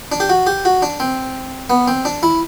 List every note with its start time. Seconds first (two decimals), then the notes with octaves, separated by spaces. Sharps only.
0.12 D4
0.20 G4
0.29 F#4
0.47 G4
0.65 F#4
0.82 D4
1.00 C4
1.70 B3
1.88 C4
2.05 D4
2.23 E4